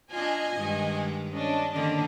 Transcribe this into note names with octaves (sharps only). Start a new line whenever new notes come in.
D4 F4 D#5 G#5
G2 D#3 G#3
C#4 D4 D#5
D3 D#3 A#3 D4